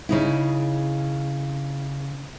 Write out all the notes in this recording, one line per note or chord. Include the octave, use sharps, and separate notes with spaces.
C#3 D#4 E4